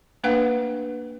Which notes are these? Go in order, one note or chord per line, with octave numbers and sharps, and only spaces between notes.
A3 A#3 D4 B4 F5 F#5